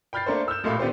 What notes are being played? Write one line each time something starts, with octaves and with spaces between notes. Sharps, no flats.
G5 B5 F6 G6 A6 C7
A3 A#3 D4 A4 C5
E6 F6 G6 E7
A1 A#2 A3 F5 B5
D#3 B3 D4 F4 G4 C5